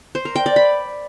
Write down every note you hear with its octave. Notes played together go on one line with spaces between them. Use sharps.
C5
A#4
G5
D5
B5